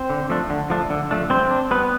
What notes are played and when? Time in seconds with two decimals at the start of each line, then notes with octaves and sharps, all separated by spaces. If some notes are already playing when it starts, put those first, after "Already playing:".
Already playing: C4 C5
0.10 D3
0.30 F3 A3 D4
0.50 D3
0.70 F3 A3 D4
0.90 D3
1.11 F3 A3 D4
1.30 G3 C4 C5
1.51 D4
1.71 G3 B3 B4